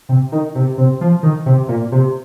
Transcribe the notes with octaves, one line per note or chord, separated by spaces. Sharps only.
C3
D#3
C3
C3
F3
D#3
C3
A#2
C3